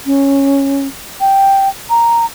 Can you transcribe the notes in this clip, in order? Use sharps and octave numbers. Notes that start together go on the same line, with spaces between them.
C#4
G5
A#5